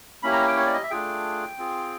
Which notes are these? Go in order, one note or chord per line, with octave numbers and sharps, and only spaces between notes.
A#3 C#4 E4 G4 B5
A#5
G5
C#5
D5
D#5
E5
A3 D4 F4 G#4 G5
C4 F4 G#4